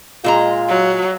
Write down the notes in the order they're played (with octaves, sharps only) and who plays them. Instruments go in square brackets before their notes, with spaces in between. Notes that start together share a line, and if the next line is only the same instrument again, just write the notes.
[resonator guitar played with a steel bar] A#2 G#3 A#5 [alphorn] F4
[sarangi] F#3